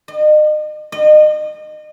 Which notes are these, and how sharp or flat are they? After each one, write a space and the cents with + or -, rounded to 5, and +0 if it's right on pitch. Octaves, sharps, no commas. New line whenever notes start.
D#5 -35
D#5 -30